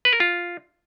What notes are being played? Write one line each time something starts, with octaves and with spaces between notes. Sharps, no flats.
B4
A#4
F4